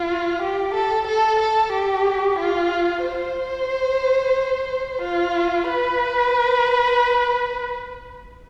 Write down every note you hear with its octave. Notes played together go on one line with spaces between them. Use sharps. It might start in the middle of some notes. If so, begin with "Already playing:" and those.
Already playing: F4
G4
A4
A4
A4
G4
F4
C5
F4
B4